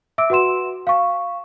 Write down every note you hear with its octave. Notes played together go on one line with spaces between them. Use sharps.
E5 D6 E6 D7
F#4 B4 F#5 C6 E7
F5 C#6